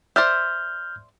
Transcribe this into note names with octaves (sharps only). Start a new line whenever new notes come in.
C5 D5 E5 F6 G6